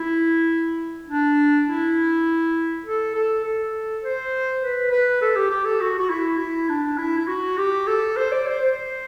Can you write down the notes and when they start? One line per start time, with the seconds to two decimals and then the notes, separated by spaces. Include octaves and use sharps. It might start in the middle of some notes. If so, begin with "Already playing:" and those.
Already playing: E4
1.08 D4
1.67 E4
2.86 A4
3.15 A4
3.44 A4
4.03 C5
4.62 B4
4.92 B4
5.22 A4
5.36 G4
5.50 G4
5.65 A4
5.81 F#4
5.98 F#4
6.10 E4
6.39 E4
6.69 D4
6.98 E4
7.18 E4
7.27 F#4
7.58 G4
7.87 A4
8.17 C5
8.32 D5
8.46 C5
8.60 C5